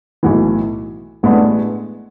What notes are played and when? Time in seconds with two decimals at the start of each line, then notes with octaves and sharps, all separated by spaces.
0.23 B1 A2 E3
1.23 A1 A2 G#3 B3 D4